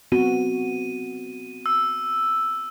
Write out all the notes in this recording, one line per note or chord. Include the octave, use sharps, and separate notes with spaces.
B3 C4 F#4 D#7
E6